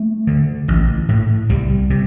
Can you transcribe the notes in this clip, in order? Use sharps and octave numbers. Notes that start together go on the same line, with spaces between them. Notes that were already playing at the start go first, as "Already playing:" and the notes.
Already playing: A3
D3
A1
A2
C2 G3
C3